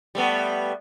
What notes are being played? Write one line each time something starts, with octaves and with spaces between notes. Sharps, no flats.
G3 A3 B3